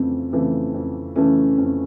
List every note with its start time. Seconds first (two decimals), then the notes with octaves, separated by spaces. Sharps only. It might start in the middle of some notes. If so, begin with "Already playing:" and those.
Already playing: F2 C#3 E3 A3 C4 C#4
0.32 C#3 E3 A3 C4
0.74 F2
1.16 C#3 E3 A3 C#4
1.58 F2 C#4